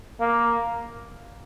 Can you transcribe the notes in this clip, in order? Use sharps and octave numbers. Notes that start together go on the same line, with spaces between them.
A#3